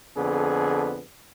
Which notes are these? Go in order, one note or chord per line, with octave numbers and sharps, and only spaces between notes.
F2 D3 B3 G#4